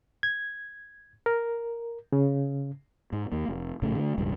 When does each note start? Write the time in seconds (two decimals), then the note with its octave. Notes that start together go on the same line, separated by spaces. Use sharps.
0.23 G#6
1.26 A#4
2.12 C#3
3.12 G#2
3.32 D#2 A#3
3.49 F1
3.82 A#1 A2 C#3 A3
3.95 D3 E3 A3
4.18 E1 C#2 G2